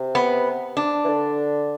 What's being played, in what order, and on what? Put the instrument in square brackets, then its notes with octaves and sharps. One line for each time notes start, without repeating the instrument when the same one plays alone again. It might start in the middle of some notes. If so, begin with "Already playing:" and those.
Already playing: [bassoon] C3
[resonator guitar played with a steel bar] B3
D4
[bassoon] E3
D3